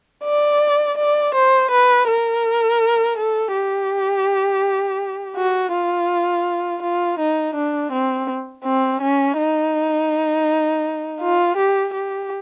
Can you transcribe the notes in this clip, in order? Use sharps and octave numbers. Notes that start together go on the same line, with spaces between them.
D5
D5
C5
B4
A#4
A4
G4
F#4
F4
F4
D#4
D4
C4
C4
C#4
D#4
F4
G4
G4